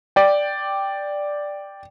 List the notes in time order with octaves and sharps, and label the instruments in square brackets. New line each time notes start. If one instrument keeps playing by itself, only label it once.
[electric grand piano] D5 G5